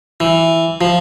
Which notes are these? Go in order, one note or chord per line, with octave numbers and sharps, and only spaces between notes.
E3
F3